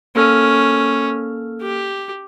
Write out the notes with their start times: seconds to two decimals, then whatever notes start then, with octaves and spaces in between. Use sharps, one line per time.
0.16 A#3 C#4 A4 F6
1.62 G4